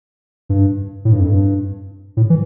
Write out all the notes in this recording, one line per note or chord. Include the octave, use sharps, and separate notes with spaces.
G2
A2
G2
F2
G2
A2
E3